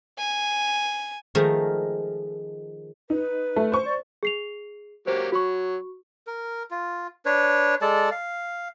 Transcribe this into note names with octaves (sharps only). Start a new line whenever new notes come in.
G#5
D#3 F3 G#3 A3 A#4
D#4 B4
A3
C5 C#6
D5
G#4 C7 F7
F#3 A#3 G4 C5
F#3 F#4 C#6
A#4
F4
D4 B4 C#5
G#3 A4 D5 A5
F5